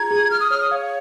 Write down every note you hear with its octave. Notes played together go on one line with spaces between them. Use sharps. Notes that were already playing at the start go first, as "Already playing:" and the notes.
Already playing: F4 G#4 A#5 G#6
G#4
G#4 F6
D#6
C#5 F6
D#6
C#5 F5